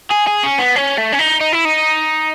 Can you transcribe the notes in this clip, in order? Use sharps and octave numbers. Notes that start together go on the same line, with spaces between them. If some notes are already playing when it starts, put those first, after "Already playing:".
G#4
G#4
C#4
B3
C#4
A3
C#4
D#4
D#4
E4
D#4